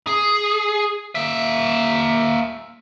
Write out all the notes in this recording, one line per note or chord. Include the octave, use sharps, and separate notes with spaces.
G#4
A#3 E5